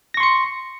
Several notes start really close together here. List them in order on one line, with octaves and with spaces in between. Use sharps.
A#6 C#6 C6 C#7